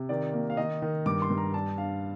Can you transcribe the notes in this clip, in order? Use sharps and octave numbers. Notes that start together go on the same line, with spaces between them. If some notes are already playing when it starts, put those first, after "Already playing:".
Already playing: C3
D#3 D5
A#3
F5
D#3 D#5
D#3
G2 D6
C6
G2
A#5
D4 A5
D4 F5